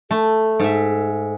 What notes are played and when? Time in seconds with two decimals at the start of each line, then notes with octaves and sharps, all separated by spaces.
0.11 A3 A4
0.60 G#2 E5